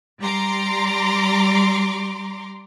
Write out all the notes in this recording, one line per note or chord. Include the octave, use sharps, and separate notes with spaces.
G3 A#5 C6 D6